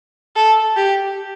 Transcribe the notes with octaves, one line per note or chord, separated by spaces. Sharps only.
A4
G4